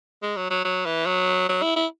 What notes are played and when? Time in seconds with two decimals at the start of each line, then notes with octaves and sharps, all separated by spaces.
0.22 G#3
0.37 F#3
0.50 F#3
0.65 F#3
0.86 E3
1.06 F#3
1.49 F#3
1.62 E4
1.76 E4